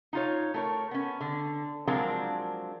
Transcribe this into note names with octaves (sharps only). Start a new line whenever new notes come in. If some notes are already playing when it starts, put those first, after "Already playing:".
D#4 F4 C#5
A3 A#4 C#5
B3 C#4
D3
F3 F#3 G#3 C4 D4 A#4